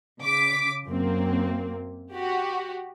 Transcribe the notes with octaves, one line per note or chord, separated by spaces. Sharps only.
C#3 D6 B6
F#2 A#3 C4
F#4 G4